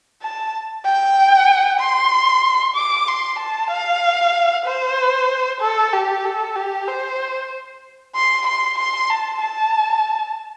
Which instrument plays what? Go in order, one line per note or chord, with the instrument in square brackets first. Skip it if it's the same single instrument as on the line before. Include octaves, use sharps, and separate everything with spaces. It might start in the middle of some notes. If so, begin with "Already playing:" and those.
[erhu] A5
G5
C6
D6
C6
A5
F5
C5
A4
G4
A4
G4
C5
C6
C6
C6
A5
A5